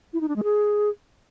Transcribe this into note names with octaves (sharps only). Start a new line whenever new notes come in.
E4
D#4
D4
G#3
G#4